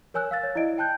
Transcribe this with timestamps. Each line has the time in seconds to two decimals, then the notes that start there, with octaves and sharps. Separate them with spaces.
0.14 A#4 C#5 G#5 E6 F#6
0.31 F5 E6 A6
0.43 C#5
0.55 E4 D5 D#5 D7
0.78 G5 A5 F#6 G6